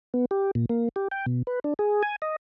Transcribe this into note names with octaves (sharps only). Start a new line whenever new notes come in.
B3
G4
A#2
A#3
G4
G5
B2
B4
D4
G#4
G#5
D#5